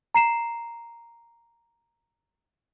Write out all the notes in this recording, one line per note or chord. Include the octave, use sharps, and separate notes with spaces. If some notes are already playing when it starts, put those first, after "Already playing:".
A#5 C7 E7